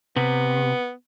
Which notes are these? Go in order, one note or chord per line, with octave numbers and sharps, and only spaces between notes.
C3 B3